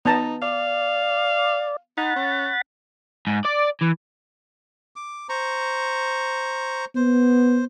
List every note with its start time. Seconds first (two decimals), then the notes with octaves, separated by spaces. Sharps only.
0.06 B3 D#4 A5 A#5
0.42 D5 F5
1.98 D#4 F#5 B5 A6
2.16 C#4
3.27 G#2
3.45 D5
3.81 E3
4.96 D6
5.29 C5 A#5 C#6
6.96 B3 C5